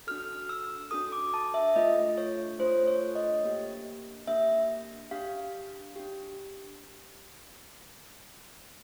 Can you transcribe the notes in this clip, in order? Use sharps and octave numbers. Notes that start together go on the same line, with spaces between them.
D4 F#4 A4 F6
E6
D4 F#4 A4 D#6
D6
A5
E5
A3 D4 F4 A4 D#5
C#5
A3 D4 F4 A4 C5
C#5
D#5
A#3 D4 G4
A#3 D4 G4 E5
D4 G4 F5
D4 G4